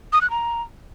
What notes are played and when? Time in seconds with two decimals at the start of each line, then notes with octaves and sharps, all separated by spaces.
0.13 D#6
0.21 F#6
0.30 A#5